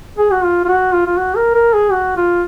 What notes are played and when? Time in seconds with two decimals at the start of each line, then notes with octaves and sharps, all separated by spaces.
0.18 G#4
0.31 F#4
0.44 F4
0.65 F4
0.68 F#4
0.93 F4
1.07 F4
1.17 F#4
1.36 A#4
1.54 A#4
1.74 G#4
1.92 F#4
2.17 F4